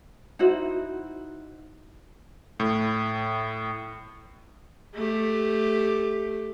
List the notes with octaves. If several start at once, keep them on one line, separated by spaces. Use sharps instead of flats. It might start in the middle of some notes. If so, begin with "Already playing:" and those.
D#4 E4 F#4 C5
A2
A3 G4